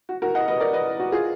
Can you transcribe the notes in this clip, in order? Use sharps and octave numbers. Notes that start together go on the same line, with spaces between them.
F#4
F#4 A#4
D#5 F#5
B4 D#5
A#4 D5
B4 D#5
F#4
F4 G#4